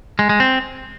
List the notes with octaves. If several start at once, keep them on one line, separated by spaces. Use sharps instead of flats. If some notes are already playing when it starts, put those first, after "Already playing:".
G#3
G#3
C4